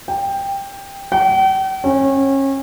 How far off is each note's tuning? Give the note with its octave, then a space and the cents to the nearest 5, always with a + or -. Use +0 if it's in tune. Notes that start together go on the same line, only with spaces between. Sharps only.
G5 +10
G5 -45
C#4 -30